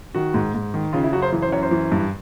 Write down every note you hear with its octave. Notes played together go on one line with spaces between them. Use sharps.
D#3 F#4
G#2
G#2
D#3
C#3 F4
E4
F#2 F#4
C5
E3
C5
F#2 C#5
C5
E3
G2